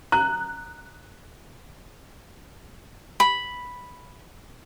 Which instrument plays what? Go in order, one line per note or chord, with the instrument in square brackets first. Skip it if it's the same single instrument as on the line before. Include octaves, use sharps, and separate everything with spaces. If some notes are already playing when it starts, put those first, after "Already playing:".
[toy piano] A#5 [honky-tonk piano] F#6
[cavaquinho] B5